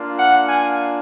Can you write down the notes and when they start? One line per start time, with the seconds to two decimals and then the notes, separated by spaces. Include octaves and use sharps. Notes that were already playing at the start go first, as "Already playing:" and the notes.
Already playing: A#3 D4 F4
0.17 F#5
0.47 G#5